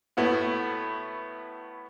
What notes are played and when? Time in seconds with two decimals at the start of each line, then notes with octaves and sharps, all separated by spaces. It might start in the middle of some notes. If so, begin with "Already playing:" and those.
0.17 A2 A3 B3 E4 F#4